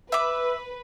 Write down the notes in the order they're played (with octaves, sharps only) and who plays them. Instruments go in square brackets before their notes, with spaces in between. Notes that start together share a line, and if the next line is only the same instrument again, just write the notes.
[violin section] B4 [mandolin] E5 D6